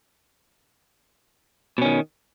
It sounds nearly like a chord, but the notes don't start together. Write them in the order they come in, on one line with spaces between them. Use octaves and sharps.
B2 C#4 D#3